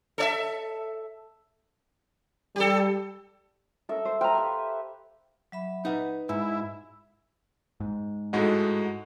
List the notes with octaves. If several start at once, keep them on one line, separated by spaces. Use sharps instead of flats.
A4 C#5 E5
G3 G4 A4
C#4 A4 A#4 E5
C5
B4 C5 F5 G5 A#5
G4 E5
F#3 E5 B5
D#4 B4 F#5
G#2 E4
G#2
A2 G#3 D#4 F#4 A4